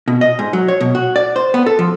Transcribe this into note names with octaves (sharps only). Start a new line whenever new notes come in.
B2
D#5
G#2
F#3
C#5
B2
F#4
D5
C5
B3
A4
F3